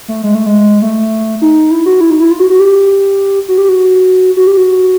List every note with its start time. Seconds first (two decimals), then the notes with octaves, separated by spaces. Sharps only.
0.08 A3
0.23 G#3
0.35 A3
0.46 G#3
0.82 A3
1.42 D#4
1.71 E4
1.86 F#4
2.01 E4
2.10 D#4
2.20 E4
2.30 F4
2.40 F#4
2.50 F#4
2.59 G4
3.48 F#4
3.58 G4
3.69 F#4
4.37 F#4
4.47 G4
4.57 F#4